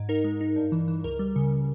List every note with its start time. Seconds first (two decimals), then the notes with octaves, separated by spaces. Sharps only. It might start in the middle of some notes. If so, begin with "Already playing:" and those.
Already playing: G#2
0.09 D#4 A#4
0.24 G#3
0.41 D#4
0.56 G2
0.72 E3
0.88 E3
1.04 C#2 A#4
1.19 G3
1.36 C#3